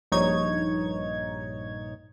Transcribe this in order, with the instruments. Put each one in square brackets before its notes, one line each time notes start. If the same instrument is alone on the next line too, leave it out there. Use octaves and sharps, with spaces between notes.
[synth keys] A#1 G2 D#4 C#5 G#6